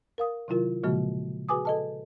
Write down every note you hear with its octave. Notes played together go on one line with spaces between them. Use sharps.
A#4 F5 D#6
C3 D#3 F#3 E4 F4 A#4
A#2 C#3 F3 G#3 A#3 F#4
F#4 G#4 B4 G#5 D6 D#6
A4 D#5 A5